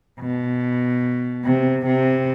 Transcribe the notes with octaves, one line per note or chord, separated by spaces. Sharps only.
B2
C3
C3